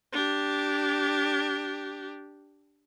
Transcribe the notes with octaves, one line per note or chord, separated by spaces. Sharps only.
D4 G4